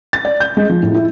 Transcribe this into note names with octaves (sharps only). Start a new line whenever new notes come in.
A6
D5
G6
G#3
F3
A2
E4